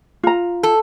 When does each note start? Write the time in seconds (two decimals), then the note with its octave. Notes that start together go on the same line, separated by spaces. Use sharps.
0.24 F4 A#5
0.63 A4